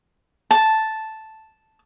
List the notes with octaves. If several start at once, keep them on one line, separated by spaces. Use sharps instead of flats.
A5